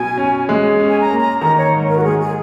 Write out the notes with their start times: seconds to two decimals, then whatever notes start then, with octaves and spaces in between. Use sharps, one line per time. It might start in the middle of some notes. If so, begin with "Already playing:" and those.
Already playing: B2 F#3 G#5
0.18 C#4
0.49 G#3
0.80 C#4
0.89 G#5
1.01 A#5
1.11 A#3
1.20 A#5
1.41 D#3 A#5
1.58 C#5
1.73 G#2
1.88 A#4
1.97 F#4
2.04 G#3 G#4
2.20 G#4